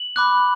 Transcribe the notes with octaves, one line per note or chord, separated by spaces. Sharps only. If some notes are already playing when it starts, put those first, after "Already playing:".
Already playing: F#7
B5 D6 F#6